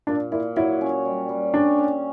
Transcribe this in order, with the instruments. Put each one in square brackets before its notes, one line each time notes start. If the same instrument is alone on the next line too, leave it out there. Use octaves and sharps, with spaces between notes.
[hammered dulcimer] A#2 [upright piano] D4
[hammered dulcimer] A#2 [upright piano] E4
[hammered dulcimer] F#3 [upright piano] E4
[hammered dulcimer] C#4
G3
G3
[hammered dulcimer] C#4 [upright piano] D4
[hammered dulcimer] C#4